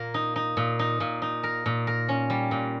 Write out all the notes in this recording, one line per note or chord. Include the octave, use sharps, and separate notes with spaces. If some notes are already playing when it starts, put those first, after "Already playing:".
Already playing: A#2 A#3 A#4
D#4
D#4
A#2
D#4
A#2
D#4
A#4
A#2
A#4
C#4
G3
A#2